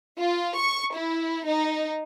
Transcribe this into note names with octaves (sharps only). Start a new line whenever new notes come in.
F4
C#6
E4
D#4